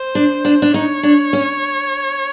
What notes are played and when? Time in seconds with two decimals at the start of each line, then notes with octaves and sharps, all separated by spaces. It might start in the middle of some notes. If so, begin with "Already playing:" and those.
Already playing: C5
0.15 D4
0.45 D4
0.62 D4
0.74 D#4 C#5
1.03 D4
1.33 C#4